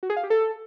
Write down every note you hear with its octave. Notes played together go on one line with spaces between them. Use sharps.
F#4
G#4
F5
G4
A4